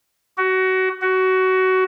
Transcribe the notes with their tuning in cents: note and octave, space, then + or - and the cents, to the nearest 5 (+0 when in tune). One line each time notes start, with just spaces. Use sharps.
F#4 +25
F#4 +20